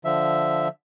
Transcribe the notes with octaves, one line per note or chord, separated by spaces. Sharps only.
D3 F3 E5